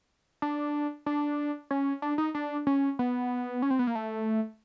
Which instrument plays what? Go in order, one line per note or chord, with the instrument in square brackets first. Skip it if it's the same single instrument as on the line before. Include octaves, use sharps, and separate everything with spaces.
[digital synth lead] D4
D4
C#4
D4
D#4
D4
C#4
B3
C#4
C4
B3
A#3
A3